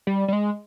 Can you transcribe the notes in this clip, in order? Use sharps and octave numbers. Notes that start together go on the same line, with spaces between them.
G3
G3
G#3